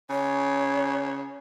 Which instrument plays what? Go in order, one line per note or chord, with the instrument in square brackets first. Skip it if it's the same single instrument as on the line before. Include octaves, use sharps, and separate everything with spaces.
[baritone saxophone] C#3 [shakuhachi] C#5